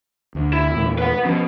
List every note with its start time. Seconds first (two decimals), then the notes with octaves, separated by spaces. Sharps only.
0.35 D2
0.53 E4
0.74 E2 A#2 A3
0.98 B4 F#5
1.25 B2 F3 C#4